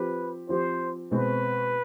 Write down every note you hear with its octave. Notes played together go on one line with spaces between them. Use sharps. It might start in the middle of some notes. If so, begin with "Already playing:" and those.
Already playing: F3 C4 G4 B4
F3 C4 G4 C5
B2 G#3 C4 B4